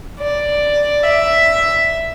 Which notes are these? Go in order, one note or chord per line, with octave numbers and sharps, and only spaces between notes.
D5
E5